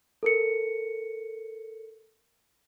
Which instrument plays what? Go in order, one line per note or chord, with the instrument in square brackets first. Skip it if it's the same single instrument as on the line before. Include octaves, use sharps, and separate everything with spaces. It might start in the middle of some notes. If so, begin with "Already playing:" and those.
[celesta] A4 A#4 C#7